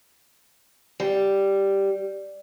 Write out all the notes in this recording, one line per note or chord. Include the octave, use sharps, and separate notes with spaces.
G3